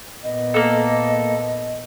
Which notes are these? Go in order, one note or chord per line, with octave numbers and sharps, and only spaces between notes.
A#2 B3 D#5
A#3 A4